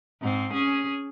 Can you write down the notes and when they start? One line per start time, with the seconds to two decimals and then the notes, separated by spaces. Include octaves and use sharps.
0.22 G#2 C4
0.53 C#4 G#4